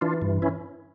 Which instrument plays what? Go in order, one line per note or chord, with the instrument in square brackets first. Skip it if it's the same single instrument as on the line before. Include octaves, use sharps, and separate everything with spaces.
[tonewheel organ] E3 D4 F4
G2
C#4 E4